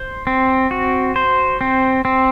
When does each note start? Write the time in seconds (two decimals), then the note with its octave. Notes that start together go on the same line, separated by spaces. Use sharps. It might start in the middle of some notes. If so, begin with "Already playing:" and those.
Already playing: C5
0.27 C4
0.71 F#4
1.16 C5
1.61 C4
2.05 C4